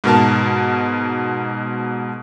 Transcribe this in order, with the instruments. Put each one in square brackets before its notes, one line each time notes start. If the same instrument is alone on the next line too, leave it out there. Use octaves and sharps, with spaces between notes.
[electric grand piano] G#2 B2 A#4 A5